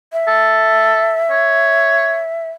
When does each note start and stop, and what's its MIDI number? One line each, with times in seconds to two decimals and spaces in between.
0.13 2.49 76
0.28 1.21 69
1.31 2.22 73